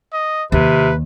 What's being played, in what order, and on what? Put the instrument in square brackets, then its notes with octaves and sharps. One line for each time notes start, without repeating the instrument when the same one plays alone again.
[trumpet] D#5
[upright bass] D#2 [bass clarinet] C3 [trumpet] B4